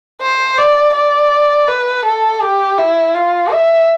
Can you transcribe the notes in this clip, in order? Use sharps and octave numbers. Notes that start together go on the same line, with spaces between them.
C5
D5
D5
B4
A4
G4
E4
F4
E5